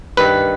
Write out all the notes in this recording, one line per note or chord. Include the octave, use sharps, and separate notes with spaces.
G2 D#3 B4